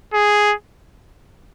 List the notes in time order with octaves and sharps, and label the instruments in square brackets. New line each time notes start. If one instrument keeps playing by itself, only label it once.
[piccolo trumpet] G#4